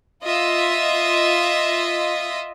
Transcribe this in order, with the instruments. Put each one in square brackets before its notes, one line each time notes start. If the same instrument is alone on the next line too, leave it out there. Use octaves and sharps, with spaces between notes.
[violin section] F4 D#5 E5